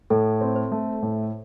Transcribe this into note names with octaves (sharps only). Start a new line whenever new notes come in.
A2 A4
C4
C5
A3
A2